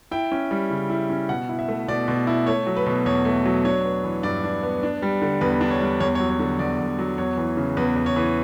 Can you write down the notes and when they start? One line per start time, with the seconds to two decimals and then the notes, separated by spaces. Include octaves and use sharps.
0.11 E4 G5
0.32 C#4
0.51 G3
0.70 C#3
0.90 E4
1.10 C#4
1.29 B2 F#5
1.49 E4
1.59 E5
1.68 A3
1.88 B2 D5
2.08 B2
2.27 E4
2.47 A3 C#5
2.67 F#3
2.77 B4
2.86 B2
3.06 E2 C#5
3.25 A3
3.45 F#3
3.65 D4 C#5
3.85 B3
4.04 E3
4.23 G2 D5
4.43 D4
4.63 B3
4.83 D4
5.02 G3
5.22 D3
5.41 E2 B4
5.61 D4
5.71 C#5
5.80 G3
6.00 E2 C#5
6.15 C#5
6.20 F#3
6.30 C#5
6.39 D3
6.59 E2 D5
6.79 E2
6.99 F#3
7.18 E2 C#5
7.37 E3
7.57 C#3
7.77 E2 B4
7.96 E2
8.06 C#5
8.16 E3